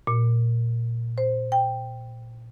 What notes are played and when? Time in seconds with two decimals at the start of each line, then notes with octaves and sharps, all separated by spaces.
0.07 A#2
1.18 C5
1.52 G5